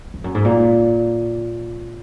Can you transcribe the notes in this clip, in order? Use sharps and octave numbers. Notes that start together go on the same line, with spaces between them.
F2
F#2
G#2
A#2